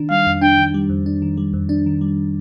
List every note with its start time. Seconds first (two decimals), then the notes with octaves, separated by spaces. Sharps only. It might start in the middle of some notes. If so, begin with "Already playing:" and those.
Already playing: D#3 D4
0.10 G3 F5
0.27 F2
0.42 D4 G5
0.58 D#3
0.74 G3
0.89 F2
1.06 D4
1.22 D#3
1.37 G3
1.53 F2
1.69 D4
1.86 D#3
2.01 G3